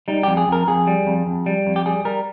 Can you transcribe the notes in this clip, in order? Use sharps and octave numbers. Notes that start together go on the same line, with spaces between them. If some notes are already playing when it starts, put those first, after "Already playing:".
G3 D#4
F2 G4
G#4
F2 A#4
F2 G#4
G3
F2
F2
G3
F2
G4
G3 G#4
G3 A#4